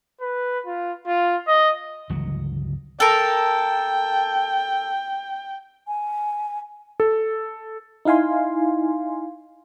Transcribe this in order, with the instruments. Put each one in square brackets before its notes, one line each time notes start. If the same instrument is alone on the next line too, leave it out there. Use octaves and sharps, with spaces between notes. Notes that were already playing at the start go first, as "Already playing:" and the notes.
[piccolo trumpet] B4
F4
F4
D#5
[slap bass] G1 C#2 E3 F#3
[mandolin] A4 A#4 [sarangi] G5
[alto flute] G#5
[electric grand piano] A4
[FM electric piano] D#4 E4 F5 G#5 C6